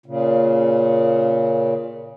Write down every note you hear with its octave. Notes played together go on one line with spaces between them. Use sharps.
A#2 C#3